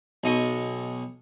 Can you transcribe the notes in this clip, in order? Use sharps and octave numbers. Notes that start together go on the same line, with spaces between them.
B1 D#5 C#6